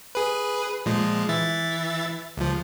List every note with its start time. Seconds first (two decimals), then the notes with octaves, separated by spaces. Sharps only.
0.15 G#4 B4
0.86 A#2 F3 G#3
1.29 E3 E5 A6
2.37 C#2 F3